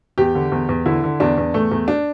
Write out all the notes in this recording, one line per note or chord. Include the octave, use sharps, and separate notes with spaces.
E2 G4
D3
E2
E2
D3 E4
D3
E2 D4
E2
E2 A3
E2
D4